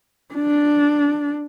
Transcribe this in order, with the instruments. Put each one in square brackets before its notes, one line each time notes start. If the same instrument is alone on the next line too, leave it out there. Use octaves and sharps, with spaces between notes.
[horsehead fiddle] D4